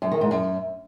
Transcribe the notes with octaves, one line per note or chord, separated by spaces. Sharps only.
F#2
D#3
G#2
F#2